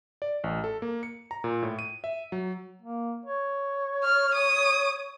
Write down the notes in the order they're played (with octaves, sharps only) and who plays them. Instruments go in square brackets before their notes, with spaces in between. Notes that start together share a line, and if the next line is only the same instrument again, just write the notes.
[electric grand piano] D5
A1
A4
A#3
C#7
A#5
A#2
A2
D#7
E5
F#3
[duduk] A#3
C#5
[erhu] F6
D#6